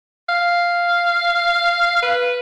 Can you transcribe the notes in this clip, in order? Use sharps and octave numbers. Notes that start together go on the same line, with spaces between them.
F5
B4